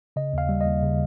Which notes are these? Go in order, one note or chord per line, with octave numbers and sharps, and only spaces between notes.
C#3 D#5
D#2 F5
G3
D#5
D#2
C#3